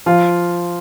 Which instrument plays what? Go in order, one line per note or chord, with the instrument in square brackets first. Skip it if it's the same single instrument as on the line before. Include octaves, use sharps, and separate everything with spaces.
[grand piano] F3 F4